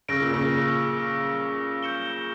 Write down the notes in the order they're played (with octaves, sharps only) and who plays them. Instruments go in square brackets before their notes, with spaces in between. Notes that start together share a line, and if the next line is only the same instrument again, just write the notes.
[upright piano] C#3 [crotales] E6 A#6 D7
[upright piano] A#2
C#3
[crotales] E6 G6 C#7 E7 G7